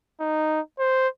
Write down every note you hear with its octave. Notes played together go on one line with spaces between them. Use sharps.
D#4
C5